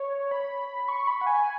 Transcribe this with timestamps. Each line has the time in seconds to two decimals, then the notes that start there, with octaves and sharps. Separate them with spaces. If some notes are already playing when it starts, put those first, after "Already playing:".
Already playing: C#5
0.31 B5
0.89 C#6
1.07 B5
1.21 F#5
1.27 G#5